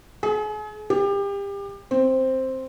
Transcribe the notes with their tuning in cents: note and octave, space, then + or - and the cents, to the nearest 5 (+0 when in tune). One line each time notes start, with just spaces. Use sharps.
G#4 +40
G4 +30
C4 +5